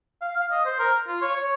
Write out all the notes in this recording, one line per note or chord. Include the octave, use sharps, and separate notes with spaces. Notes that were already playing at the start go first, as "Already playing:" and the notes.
F5
F5
D#5
C5
A#4
F4
C#5
C#5